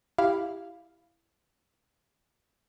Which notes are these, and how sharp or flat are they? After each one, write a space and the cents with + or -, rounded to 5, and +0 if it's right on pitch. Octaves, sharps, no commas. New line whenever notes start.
E4 +5 G4 +0 F5 +0